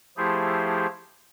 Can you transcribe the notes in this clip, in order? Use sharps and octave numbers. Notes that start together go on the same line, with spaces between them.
F3 A3 E4 G4 G#4 C5